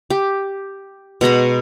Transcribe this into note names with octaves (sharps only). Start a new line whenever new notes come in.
G4
B2 G#3 A#5 B5